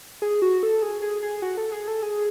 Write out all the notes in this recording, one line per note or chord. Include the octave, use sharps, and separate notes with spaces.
G#4
F#4
A4
G#4
G#4
G#4
F#4
A4
G#4
A4
G#4